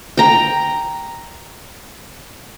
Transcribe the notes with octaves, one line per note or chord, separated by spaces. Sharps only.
G5 A#5